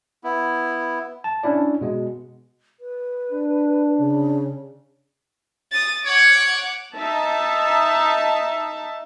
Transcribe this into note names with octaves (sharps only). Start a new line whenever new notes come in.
B3 E4
A5
C#4 D4 E4 D5
B2 G#3
B4
D4
C#3
D#6 A6
C#5 F#5 D6
D#4 E5 A5